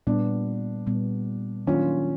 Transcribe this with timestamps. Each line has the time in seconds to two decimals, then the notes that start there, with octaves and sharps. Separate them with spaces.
0.07 A#2 G3 B3 D4
0.87 A#2 G3 B3
1.67 D#3 F#3 A#3 C#4 D4 F4